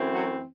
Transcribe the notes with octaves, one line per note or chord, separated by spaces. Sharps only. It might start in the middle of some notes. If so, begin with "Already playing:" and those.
Already playing: F#2 E3 A3 C4
F#3 F#4